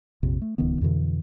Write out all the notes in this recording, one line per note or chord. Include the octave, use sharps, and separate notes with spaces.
A#1 F2 C3
A3
D1 C#2 D#3 B3
F2 B2 D3 E3